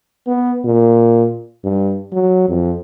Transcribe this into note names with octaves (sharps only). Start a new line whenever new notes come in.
B3
A#2
G2
F#3
F2